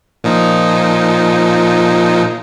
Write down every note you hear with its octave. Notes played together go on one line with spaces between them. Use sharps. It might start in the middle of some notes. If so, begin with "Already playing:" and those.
A#2 F3 D#4